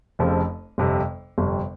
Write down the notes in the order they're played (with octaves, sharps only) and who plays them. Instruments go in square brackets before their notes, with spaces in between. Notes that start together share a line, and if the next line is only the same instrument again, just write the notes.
[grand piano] F1 F2 C#3 F3 C4
G1 F2 C3
G1 F2 C3